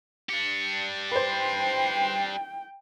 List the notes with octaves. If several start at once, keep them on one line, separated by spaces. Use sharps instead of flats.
D4 G4 C#7
B4 C5 G5 C7